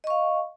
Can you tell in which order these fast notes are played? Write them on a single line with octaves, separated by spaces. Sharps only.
D#5 C#6 F5